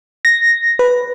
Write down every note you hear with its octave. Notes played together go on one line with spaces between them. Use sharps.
A#6
B4